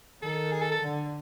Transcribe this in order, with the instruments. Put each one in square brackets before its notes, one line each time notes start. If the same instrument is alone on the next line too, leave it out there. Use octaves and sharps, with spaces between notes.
[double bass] D#3 [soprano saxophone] A4
[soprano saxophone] G#4
A4
A4
[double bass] D3